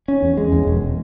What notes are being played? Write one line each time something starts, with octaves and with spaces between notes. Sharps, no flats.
C#4
E2
G#3
E2
E1